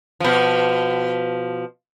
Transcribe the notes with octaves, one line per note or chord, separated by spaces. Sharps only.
B2 F3